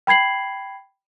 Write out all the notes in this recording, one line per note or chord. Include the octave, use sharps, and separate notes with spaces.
G5 B5 G#6 C7 F#7